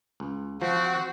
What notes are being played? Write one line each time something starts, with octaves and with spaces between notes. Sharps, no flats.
C#2
F3 C4 F#4